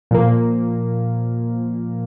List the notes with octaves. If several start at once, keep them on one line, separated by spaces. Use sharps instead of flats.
A#2 F3 A#3